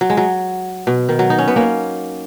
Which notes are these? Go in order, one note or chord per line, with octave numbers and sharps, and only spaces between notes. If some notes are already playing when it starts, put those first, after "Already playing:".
F#3
G#3
F#3
B2
D#3
F#3
D#4
C#4
B3
A#3 C#4